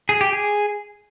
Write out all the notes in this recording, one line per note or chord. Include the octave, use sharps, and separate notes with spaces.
G#4
G4
G#4